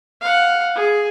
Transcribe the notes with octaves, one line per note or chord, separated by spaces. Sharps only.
F5 F#5
G#4